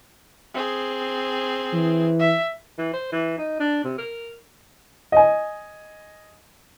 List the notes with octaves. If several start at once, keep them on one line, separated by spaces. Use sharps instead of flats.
C4 G#4
E3
E5
E3
C5
E3
D#4
D4
C3
A#4
D#5 G#5